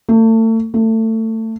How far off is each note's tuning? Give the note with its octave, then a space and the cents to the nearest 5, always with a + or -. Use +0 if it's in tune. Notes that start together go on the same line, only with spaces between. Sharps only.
A3 +35
A3 +25